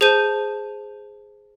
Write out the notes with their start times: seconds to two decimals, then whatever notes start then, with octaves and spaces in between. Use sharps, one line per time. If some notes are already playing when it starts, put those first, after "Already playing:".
0.01 G#4 C5 A5 G6 D#7